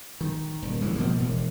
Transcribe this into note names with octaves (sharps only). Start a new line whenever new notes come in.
D#3
D#1
G#2 C#3 E3 F3
B2 F3 A#3
E1